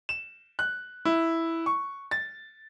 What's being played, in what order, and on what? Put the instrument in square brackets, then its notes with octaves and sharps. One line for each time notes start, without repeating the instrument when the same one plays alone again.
[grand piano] E7
F#6
E4
C#6
A6